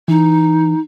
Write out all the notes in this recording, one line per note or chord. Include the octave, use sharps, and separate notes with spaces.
E3 D#4